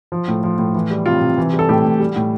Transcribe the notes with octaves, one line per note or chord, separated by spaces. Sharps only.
F3
A2
F3
A2
E3
G3
C3 F4
C3
E3
G3
A4
A2 G4
A2
G3
A2